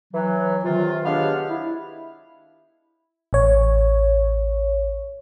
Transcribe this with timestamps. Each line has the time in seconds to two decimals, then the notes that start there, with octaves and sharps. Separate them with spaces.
0.13 E3 F#3
0.64 C3 D#3 F4
1.05 G#3 B3 D4 G4 C#5 F5
1.49 E4
3.33 A1 C#5